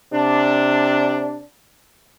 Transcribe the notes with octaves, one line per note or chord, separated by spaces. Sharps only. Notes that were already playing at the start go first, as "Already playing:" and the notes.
C3 D4